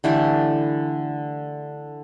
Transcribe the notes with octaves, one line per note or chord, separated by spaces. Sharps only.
D3 E3 A3 G4